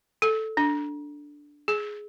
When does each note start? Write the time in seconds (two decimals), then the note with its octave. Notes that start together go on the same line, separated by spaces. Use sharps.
0.22 A4
0.57 D4
1.68 G#4